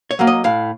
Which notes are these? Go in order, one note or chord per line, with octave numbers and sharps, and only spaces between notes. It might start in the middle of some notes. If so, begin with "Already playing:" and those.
C#5
F#3 A#3
D#5
A2 F5